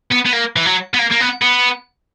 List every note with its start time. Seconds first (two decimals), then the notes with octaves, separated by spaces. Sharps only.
0.12 B3
0.26 B3
0.33 A#3
0.56 E3
0.66 F#3
0.94 B3
0.99 A#3
1.11 A#3
1.20 B3
1.42 B3